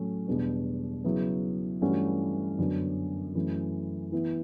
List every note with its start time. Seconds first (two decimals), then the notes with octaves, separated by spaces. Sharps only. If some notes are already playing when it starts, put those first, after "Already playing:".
Already playing: A2 F#3 A3 C#4
0.28 E2 B2 G3 B3 D4
1.04 C#3 F#3 B3 E4
1.81 G2 E3 A3 C#4 F#4
2.59 F#2 D3 F#3 B3 D4
3.35 F#2 E3 A3 C#4
4.12 E3 B3 E4